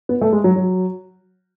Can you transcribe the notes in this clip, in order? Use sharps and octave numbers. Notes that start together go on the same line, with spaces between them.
B3
A3
G#3
F#3
F#3